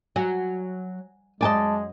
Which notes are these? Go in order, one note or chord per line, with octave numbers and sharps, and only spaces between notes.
F#3 G#5
F#2 G#3 D5 D#5 G#5 A5